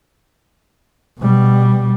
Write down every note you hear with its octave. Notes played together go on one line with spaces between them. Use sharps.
B2 G3